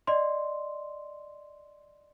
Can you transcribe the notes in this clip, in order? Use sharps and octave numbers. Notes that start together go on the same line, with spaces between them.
D5 D#5 C6